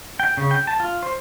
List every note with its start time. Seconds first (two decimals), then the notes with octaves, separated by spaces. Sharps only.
0.20 G5
0.37 C#3
0.51 G5
0.67 A5
0.80 F4
1.03 C5